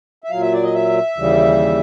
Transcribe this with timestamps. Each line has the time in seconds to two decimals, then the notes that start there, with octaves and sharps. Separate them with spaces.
0.24 E5
0.30 A#2 F#3 F5
0.41 E5
0.53 D5
0.63 D#5
0.74 E5
1.16 D#2 C#3 E3 G3